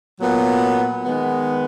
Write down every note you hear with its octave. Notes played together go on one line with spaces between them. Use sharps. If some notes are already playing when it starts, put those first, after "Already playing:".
A#2 F#3 B3
D#3 G#3 B3